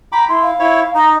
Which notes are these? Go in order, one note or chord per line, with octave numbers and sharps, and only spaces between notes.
G5 A#5 B5 D6
E4 C6
F5
E4 C#5
D#4 A#5